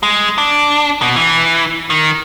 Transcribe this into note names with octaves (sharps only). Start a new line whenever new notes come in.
G#3
D4
B2
E3
D#3